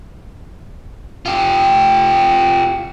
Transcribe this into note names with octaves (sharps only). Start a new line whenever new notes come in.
F4 G4